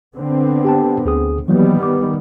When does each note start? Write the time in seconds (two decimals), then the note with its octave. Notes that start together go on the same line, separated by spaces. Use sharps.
0.17 D3 B3 C4
0.65 G4 G5 A5
1.05 D2 G#4 D#6
1.48 D#3 E3 F#3 G3 A#3 B3
1.83 D6